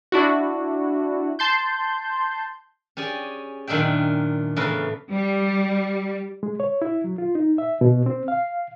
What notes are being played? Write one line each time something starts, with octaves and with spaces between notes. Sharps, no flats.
D4 E4 F#4
A5 C6 G6
C#4 G4 G#4 D5
F#2 A#2 D#3 D4 E5 G5
E2 A2 C#3 A#4 B4
G3
G#3
C#5
E4
F#3
F4
D#4
E5
B2
C4
F5